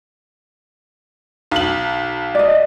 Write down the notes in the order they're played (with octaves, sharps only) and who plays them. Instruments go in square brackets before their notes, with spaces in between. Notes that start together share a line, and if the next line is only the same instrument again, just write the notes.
[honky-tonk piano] B1 F#7
[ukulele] D5 D#5